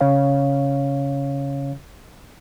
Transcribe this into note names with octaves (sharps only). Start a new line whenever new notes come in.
C#3 C#4 C#5 F5